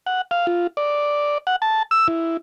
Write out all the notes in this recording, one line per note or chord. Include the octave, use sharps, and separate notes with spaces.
F#5
F5
F4
D5
F#5
A5
E6
E4